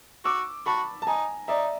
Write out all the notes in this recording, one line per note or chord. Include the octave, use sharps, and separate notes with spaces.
F#4 D6 E6
F#4 A5 B5
A5
D#4 G#5 A#5
D#4 D5 E5